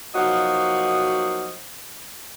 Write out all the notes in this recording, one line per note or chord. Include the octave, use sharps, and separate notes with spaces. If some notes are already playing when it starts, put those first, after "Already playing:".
F3 F#3 A#3 D#4 F#4 D#5